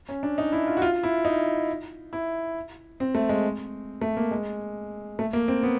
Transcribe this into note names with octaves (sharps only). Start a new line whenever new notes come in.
C#4
D4
D#4
E4
F4
F#4
F4
E4
D#4
E4
C4
A3
G#3
A3
A#3
G#3
A3
A#3
C4
B3